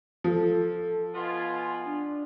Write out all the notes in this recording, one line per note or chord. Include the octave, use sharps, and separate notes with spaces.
F3 A4
B2 B3 F4 G#5
D4